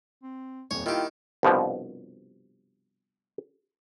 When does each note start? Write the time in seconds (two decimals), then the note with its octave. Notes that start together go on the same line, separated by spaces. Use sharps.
0.23 C4
0.71 D#1 F2 C#5
0.86 D#3 E4 F4 G4
1.43 C2 G2 B2 F3